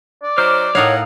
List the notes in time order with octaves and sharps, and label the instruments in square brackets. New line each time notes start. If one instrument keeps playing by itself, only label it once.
[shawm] D5
[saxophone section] F#3 D#4 C5 [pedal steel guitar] D6 F6
[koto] A2 D#4 F5 [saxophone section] A#4 D#5 F#5 [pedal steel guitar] C#5